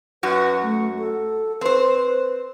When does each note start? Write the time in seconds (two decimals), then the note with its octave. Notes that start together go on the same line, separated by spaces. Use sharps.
0.23 F#2 F#4 B4
0.62 A3
0.99 A4
1.61 C4 B4 C5